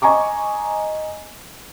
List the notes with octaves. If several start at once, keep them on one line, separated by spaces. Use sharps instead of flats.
D#5 G#5 A#5 C#6 D6